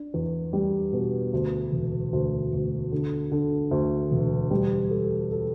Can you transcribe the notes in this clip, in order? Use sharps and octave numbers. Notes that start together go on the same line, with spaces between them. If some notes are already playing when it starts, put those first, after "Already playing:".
Already playing: D4
E2
G3
B2
D2
E1
D2
D2
D3
D3
D2
E1
G3
A4
A4